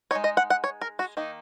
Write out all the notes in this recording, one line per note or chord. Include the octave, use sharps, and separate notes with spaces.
G#3 D#4 C#5
D#5
F#5
F#5
C#5
A#4
F#4
D#3 A#3 D#4